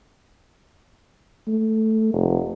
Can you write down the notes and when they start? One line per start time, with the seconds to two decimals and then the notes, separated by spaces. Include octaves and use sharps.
1.48 A3
2.13 F1